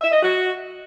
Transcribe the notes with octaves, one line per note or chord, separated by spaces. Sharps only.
E5
D#5
F#4